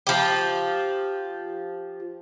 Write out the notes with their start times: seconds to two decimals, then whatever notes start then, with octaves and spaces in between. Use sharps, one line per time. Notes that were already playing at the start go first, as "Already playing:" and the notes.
0.07 F3 G4